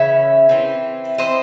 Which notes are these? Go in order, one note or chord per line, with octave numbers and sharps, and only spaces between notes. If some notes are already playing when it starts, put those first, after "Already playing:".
Already playing: C#3 E3 C#4 E5
E3 C4
E3 C4 C5 D#5